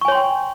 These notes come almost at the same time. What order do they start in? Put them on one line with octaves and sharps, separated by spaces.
C#6 G#5 C#5 C6 G5